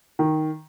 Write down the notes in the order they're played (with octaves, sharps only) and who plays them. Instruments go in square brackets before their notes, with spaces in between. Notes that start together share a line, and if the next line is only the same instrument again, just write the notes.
[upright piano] D#3